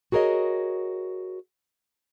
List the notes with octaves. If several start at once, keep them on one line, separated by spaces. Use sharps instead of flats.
F#4 G#4 A#4 C#5 D#5